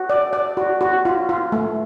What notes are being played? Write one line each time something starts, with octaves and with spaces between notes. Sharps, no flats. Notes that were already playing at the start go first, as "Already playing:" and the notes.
Already playing: F#4
D5
D5
F#4
F#4
F4
F4
A3